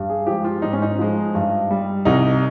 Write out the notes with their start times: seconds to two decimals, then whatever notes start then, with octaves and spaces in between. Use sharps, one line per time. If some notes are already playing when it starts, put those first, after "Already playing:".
Already playing: G2
0.09 G#4
0.27 F3 G#3 G4
0.44 F4
0.62 G#2 D#4
0.73 C#4
0.82 D#4
0.99 F3 G#3
1.35 G2
1.71 G3
2.05 C2 D#4